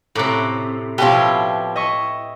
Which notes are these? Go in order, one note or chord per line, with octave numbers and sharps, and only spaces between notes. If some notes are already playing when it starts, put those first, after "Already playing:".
A2 C3 A#5 D6 F#6
B2 F3 E4 G4 B4 C#5 F5
D#5 E5 C#6